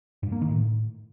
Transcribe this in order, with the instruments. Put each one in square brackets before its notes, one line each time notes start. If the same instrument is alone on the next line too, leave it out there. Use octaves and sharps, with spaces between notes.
[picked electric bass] G2
A#3
D#3
A2